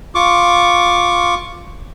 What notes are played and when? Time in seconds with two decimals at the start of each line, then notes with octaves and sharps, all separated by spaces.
0.15 F4 C#6 D6